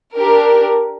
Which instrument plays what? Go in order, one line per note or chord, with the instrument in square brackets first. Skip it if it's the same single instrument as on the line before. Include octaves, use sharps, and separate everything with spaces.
[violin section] D4 G4 A#4